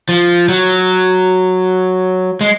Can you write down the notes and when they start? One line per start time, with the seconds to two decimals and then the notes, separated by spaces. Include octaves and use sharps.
0.09 F3
0.49 F#3
2.41 G#3